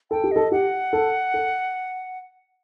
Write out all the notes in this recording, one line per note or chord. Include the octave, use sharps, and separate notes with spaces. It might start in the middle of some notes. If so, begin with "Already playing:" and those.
A4 G5
G4
A4 D#5
G4 F#5
A4
A4